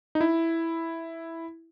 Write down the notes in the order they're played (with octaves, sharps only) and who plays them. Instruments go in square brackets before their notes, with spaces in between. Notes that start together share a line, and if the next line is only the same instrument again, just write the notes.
[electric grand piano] D#4
E4